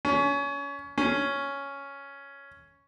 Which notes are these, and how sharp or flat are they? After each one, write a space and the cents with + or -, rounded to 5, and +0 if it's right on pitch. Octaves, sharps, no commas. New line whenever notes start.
C#4 +25
C#4 +5